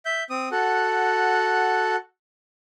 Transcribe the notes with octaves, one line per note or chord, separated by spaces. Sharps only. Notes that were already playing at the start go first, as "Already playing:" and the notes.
E5 G6
C4 D#6
F#4 A4 F#5